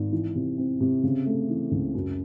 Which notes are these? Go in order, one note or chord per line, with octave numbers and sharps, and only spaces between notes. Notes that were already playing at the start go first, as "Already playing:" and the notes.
Already playing: G#1
E3
C3
C4
C3
C#3
A3
E3
C#2
F#2